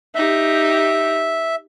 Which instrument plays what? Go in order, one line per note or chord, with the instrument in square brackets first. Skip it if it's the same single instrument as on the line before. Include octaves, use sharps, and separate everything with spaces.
[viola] D#4 G4 [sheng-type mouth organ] E5